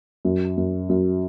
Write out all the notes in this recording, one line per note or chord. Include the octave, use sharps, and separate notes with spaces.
F#2
F#2
F#2